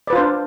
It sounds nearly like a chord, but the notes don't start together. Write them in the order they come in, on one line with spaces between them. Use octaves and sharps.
D5 B4 F4 C5 D4